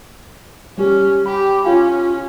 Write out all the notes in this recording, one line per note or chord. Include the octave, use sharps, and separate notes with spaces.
G3 C#4 G4
G4 B5
C#4 F4 F5 G#5